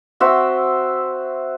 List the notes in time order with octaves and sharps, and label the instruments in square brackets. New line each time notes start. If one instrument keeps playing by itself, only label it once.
[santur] C4 F#4 C5 E5